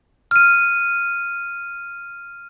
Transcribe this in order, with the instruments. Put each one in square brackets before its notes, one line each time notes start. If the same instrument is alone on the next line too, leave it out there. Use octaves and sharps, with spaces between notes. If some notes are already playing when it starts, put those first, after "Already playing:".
[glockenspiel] F6 D#7